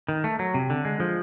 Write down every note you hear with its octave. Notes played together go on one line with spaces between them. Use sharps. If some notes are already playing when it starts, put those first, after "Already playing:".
D#3
A3
F#3
C3
D3
G#3
F3